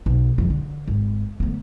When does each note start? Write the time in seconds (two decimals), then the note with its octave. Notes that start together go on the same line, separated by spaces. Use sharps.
0.06 B1
0.38 F2 D#3
0.50 D3
0.88 G#1
1.40 D2 B3